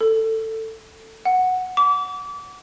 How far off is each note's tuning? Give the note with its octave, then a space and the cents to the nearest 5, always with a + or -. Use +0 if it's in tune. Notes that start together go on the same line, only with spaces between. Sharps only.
A4 +15
F#5 -5
D6 -30